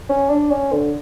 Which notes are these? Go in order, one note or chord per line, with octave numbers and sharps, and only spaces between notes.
C#4
D4
C#4
D3